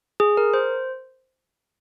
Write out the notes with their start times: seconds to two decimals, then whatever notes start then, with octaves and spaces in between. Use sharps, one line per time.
0.20 G#4
0.37 A#4
0.54 C5